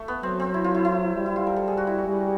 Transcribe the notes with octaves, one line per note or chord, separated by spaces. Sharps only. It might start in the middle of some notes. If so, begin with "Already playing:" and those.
Already playing: A3
B3
F#3 C4
C4
E4
F4
E4
E4
G3
E4
F4
A#4
A4
G#4
F#4
E4
F#4
G3